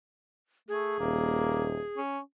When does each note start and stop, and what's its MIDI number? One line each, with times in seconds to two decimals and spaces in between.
0.69 0.98 57
0.69 2.00 68
1.00 1.79 27
1.00 1.73 58
1.97 2.20 61